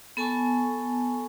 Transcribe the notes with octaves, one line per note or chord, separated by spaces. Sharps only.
B3 A4 G#5 A5 C#6